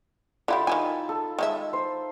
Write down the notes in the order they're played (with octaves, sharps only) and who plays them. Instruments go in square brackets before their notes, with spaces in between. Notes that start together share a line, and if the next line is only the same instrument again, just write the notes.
[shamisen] D3 E4 G4 [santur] F4 A5 B5
[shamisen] D#3 E4 G#5 [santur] D#4
[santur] A4
[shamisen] D#3 G#3 E5
[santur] C5